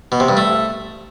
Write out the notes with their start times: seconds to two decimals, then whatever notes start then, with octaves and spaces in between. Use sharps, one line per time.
0.12 B2
0.20 C3
0.29 G2
0.37 A3